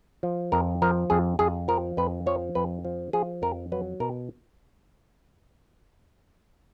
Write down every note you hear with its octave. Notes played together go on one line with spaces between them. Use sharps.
F3
F2 A#4
F3 A#4
F2 G#4
F2 G#4
F3 A#4
F2 B4
F3 C#5
F2 B4
F3
F3 G#4
F2 A#4
F#3 B4
B2 A#4